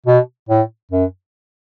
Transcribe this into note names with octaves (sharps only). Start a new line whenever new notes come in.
B2
A2
F#2